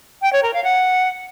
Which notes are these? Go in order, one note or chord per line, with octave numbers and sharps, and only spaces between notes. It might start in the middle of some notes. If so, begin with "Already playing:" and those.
G5
C#5
A#4
F5
F#5